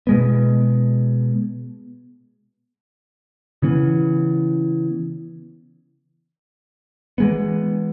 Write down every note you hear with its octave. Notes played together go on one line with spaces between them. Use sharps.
B2 G#3 B3
C#3 E3 B3
E3 G#3 B3